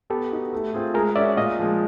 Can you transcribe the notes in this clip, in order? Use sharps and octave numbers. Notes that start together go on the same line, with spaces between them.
B3 G4 A4
D#4 F#4
A3
C4 F4 G#4
G#3 G#4 A#4
C#4 F#4 D5 E5
A#2 D#5 F5
F3 G#3